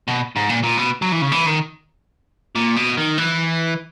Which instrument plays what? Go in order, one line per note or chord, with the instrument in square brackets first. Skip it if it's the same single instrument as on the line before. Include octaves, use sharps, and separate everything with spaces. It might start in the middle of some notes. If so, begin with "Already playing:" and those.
[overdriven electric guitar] B2
G#2
A#2
A#2
B2
F#3
E3
C#3
E3
D#3
A#2
B2
D#3
E3